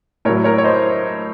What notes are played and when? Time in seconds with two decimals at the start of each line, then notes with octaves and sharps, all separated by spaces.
0.25 A2 A#4 C#5
0.29 F#3
0.44 A#4 C#5
0.58 C#5
0.64 C5 D#5